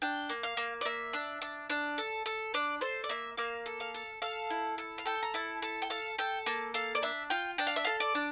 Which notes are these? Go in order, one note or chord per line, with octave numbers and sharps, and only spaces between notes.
D4 G5
A#3
F5
A#3
D5
A#3 E5
D4
D4
D4
A4
A4
D4 D5
A4 C5
D5
A#3 E5
A#3 F5
A4
F5
A4
A4 F5
E4
A4
F5
A4 G5
A#5
E4 A5
A4 A5
G5
A4 F5
A4 G5
A#3 A5
A4 F5
D5
D4 E5
F4 G5
D4 G5
F5
E5
A4 F5
D5
D4